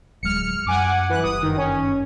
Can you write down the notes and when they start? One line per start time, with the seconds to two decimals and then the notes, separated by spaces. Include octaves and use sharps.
0.23 D1 F#3 G#3 F6 C#7
0.66 F#2 G3 F#5 G#5 D6
1.09 E3 B4 F#6
1.23 F#1 G2 D#6
1.42 D#3
1.57 C#4